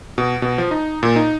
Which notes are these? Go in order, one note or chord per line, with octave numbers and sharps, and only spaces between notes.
B2
B2
F3
D#4
A#2
D#4